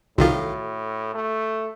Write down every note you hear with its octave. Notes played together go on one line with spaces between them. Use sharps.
C2 A2 D#3 F4 F#4 A4
A3